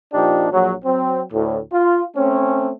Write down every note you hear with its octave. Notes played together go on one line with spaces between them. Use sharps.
A#2 F3 D4 D#4 G4
A#1 F#3
F#3 C4
D2 A2
F4
A3 C4 C#4